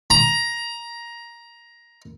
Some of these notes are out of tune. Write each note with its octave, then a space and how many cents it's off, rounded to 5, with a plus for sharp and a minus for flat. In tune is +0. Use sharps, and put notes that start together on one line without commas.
A#5 +15